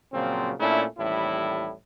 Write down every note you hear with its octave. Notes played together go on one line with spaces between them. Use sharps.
A#2 C#3 F3 F#3 C4
A#2 A3 C#4 D4 E4
A1 D#2 A2 G3 E4